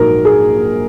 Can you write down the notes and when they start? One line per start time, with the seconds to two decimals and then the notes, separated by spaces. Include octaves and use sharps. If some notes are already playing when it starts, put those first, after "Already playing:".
Already playing: A#1 G#2 F#3 A#4
0.25 G#4